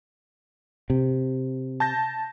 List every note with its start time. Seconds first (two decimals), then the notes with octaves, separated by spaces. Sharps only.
0.90 C3
1.80 A5 G6 A#6